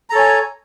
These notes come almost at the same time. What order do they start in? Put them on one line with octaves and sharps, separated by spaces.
A#5 A4 C#5 G#5